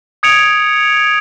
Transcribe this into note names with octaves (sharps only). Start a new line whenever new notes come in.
D#6 G#6 C#7 D7 F7